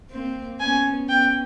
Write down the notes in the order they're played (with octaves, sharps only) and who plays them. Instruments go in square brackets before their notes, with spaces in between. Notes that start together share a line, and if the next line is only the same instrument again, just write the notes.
[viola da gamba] A#3 C4
[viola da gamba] B3 C#4 [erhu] G#5
[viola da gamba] B3 C#4 [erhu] G5